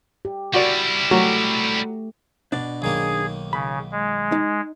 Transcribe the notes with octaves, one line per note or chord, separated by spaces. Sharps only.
G4
G3 E4 F#4 D5
F#3 A3 G4
B2 D4 D5
B1 D#3 A#3 G#4
C#3 B5
G#3
D#4